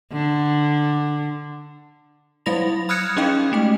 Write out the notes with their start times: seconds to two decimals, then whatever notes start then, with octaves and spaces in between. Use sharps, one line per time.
0.13 D3
2.46 F#3 G3 E4 B5 A#6 F7
2.89 B5 D#6 F6 F#6 G#6 C#7
3.17 C#4 D#4 G#4 D#5 F5 G5
3.52 G#3 A3 G5